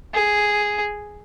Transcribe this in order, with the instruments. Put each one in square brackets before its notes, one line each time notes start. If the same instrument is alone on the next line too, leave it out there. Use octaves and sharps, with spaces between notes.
[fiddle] G#4